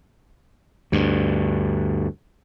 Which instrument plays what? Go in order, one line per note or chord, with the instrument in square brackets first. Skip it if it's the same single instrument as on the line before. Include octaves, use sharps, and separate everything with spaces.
[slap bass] D2 G2